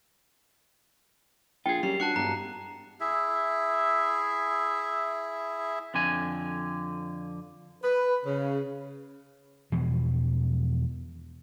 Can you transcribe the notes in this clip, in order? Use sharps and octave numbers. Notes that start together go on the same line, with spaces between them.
A#1 F4 G#4 G5
F#2 G3 C7
G2 F#4 A5 F#6 C#7
E1 G2 A#5
E4 G#4 E5
F2 D3 G#5
B4
C#3
E2 B2 E3 F3